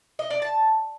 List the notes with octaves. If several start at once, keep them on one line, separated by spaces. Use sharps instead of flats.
D#5
D5
A5